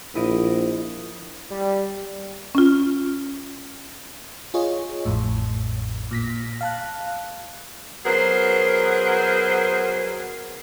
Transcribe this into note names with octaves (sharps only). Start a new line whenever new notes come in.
A#1 E4 D#5 D7
G3
C#4 F4
F4 G#4 C#5 D#5
A1 F2 A2
A#2 A#6 B6
F5 A5 F#6
F#3 B3 G#4 A#4 C5